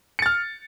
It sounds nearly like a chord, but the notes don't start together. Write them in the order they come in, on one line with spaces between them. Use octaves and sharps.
C#7 A6 F6